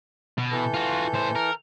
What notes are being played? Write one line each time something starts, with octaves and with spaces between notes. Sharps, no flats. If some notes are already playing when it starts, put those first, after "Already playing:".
B2
E3 A4 G6
F4 F#4
A2 C5
A#4